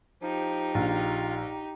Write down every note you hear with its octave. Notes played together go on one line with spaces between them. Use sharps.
F3 D#4 G4
A#1 F4